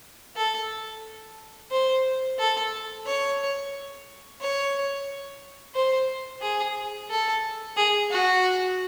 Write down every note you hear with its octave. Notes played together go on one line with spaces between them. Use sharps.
A4
C5
A4
C#5
C#5
C5
G#4
A4
G#4
F#4